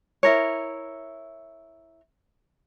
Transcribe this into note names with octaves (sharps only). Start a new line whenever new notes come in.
E4 A#4 C#5